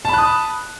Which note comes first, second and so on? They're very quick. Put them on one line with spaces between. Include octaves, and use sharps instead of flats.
A5 B5 F#6 D#6